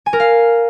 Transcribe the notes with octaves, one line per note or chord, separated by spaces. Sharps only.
G#5
A#4
F5